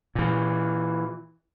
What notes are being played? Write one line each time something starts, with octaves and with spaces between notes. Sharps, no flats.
A#2 E3